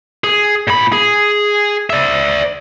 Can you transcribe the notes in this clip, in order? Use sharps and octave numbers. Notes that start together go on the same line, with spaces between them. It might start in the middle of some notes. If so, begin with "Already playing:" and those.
G#4
A#2 B5
G#4
D5 E5